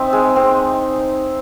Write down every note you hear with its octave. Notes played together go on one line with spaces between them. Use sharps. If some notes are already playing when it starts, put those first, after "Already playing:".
Already playing: C4 D#4 E5
G#3
C4